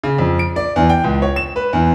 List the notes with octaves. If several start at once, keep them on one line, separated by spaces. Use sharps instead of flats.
C#3
F2
D7
D5
E2
G5
C#2
C#5
E7
B4
E2